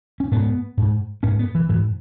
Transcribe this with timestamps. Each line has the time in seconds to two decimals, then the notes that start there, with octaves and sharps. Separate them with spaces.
0.20 C#4
0.31 G#2 B3
0.78 G#2
1.23 G#2 C#4
1.39 B3
1.55 E3
1.69 G#2 E3